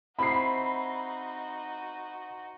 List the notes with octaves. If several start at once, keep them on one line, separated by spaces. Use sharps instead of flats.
C4 D#4 E4 F#4 B5 C7